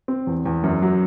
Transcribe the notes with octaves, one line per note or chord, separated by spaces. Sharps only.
C4
E2
E2
F#2
F#3